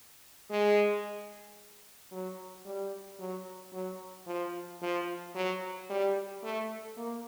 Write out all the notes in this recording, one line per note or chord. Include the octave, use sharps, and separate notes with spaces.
G#3
F#3
G3
F#3
F#3
F3
F3
F#3
G3
A3
A#3